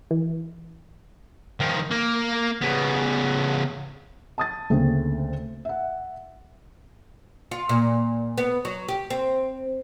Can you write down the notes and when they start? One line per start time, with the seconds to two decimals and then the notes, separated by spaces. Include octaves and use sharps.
0.11 E3
1.60 D#3 F3
1.91 A#3
2.62 C#3 B3
4.38 A5 D#6 A6
4.70 D2 C#3 A3 A#3 C4
5.65 E5 F#5
7.51 F4
7.69 A#2
8.37 B3
8.65 F#3
8.88 G4
9.10 C4